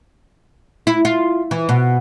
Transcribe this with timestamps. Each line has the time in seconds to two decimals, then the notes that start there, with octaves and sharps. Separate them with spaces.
0.87 E4
1.05 F4
1.51 E3
1.69 B2